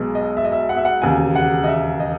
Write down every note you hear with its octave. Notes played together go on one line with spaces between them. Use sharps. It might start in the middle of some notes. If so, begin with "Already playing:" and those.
Already playing: B1 B2 G#3
D#5
E5
D#5
E5
F#5
E5
F#5
E1 D#2 C#3 G#5
F#5
D#5
E5
D#5